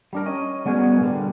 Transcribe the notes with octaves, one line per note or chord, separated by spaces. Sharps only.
G3 D4 A#4
C#4 D#5
G3 B3 F#4 G#4 A#4 B4
A#2 D3 G3